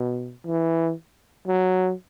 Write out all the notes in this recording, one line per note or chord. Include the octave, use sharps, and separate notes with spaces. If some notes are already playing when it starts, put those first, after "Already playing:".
Already playing: B2
E3
F#3